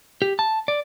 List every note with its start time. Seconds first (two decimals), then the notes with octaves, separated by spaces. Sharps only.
0.22 G4
0.39 A5
0.68 D5